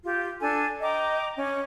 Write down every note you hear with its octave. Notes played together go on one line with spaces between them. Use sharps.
F4 G4
D4 A4 G#5
D#5 G5 A#5 D6
C#4